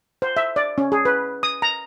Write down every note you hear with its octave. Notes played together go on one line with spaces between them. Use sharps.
C5
E5
D5
C#4
G#4
B4
D#6
A#5